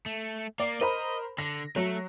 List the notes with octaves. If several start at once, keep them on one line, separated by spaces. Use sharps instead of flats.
A3
A#3 D5
A#4 C5 D#5 B5
D3 A#6
F#3 A3